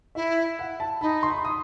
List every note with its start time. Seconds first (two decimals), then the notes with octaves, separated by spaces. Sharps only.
0.15 E4 E5
0.59 F#5
0.80 A5
1.01 D#4 B5
1.23 C6
1.30 B5
1.38 C6
1.45 D#6